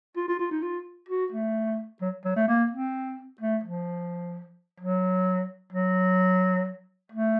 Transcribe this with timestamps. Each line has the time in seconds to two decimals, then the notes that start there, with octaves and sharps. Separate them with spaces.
0.16 F4
0.28 F4
0.39 F4
0.51 D#4
0.62 F4
1.09 F#4
1.32 A3
2.01 F#3
2.25 F#3
2.36 A3
2.48 A#3
2.71 C4
3.40 A3
3.64 F3
4.80 F#3
5.72 F#3
7.12 A3